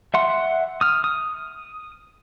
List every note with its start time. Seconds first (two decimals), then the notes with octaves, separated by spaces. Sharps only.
0.14 E5 F#5 C6
0.81 D#6 F6
1.04 D#6